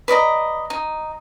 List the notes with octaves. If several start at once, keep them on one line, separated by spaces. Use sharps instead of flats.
B4 D5 D#5 A#5
D#4